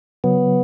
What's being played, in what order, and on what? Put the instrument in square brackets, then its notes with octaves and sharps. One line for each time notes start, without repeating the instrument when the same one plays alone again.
[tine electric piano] C#3 F#3 [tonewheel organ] B3